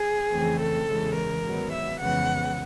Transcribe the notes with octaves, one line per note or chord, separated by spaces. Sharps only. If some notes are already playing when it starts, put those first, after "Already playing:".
Already playing: G#4
F2 C#3 E3 A3 C4
A4
E2 C#3 E3 G#3
A#4
G#2 D#3 F#3 B3
E5
F2 C#3 E3 G#3 B3 F#5